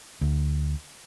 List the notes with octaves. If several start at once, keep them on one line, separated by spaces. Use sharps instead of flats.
D2